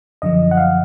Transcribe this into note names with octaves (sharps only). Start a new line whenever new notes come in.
F#2 D3 F3 D#5
F#5
F5